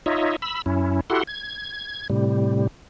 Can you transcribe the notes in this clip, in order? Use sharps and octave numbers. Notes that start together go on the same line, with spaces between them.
D#4 F4 C#5 D#5 E5
B5 E6
F#2 C#4 E4
E4 F#4 G4 A4 F#5 C6
G#6
A2 C3 G3